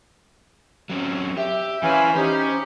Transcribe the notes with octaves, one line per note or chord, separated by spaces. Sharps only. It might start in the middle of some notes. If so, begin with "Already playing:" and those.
F#3 C4 C#4
G4 E5
E3 C#4 B4 C5 F5 G#5
C#4 D#4 G4 C5